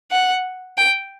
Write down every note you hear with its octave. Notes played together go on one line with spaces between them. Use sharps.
F#5
G5